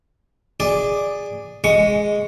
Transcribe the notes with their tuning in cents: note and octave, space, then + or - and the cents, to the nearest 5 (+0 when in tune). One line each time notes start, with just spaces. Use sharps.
G#4 -15 D5 +0
G#3 +0 C#6 +10